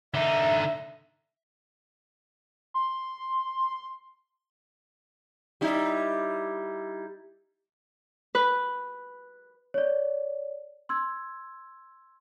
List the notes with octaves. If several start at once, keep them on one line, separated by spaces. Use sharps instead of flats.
D3 D#4 E5
C6
G3 D#4 E4
B4
C#5 D5
C6 E6 G#6